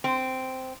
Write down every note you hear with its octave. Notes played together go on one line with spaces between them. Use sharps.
C4